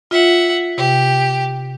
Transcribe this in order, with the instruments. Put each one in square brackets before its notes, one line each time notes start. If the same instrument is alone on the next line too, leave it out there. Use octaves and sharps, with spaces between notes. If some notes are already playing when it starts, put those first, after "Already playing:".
[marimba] F4 [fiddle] E5 F#5
[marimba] C3 [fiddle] G4